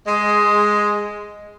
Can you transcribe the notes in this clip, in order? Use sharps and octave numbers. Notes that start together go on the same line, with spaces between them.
G#3